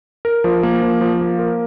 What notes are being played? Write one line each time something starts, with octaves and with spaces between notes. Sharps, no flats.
A#4
F3
A#3
F3
F3
A#3
A#4